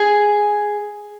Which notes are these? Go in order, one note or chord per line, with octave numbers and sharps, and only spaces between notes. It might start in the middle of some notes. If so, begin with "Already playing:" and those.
Already playing: G#4